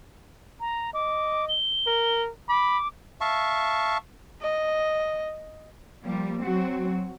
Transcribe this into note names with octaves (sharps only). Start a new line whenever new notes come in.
A#5
D#5 D6
G7
A#4
B5 D6
E5 F5 A5 C#6
D#5
F3 G3 A#3
F#3 C4 F#4